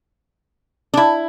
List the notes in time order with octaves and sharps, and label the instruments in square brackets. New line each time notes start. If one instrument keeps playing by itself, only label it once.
[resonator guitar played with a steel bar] D4
E4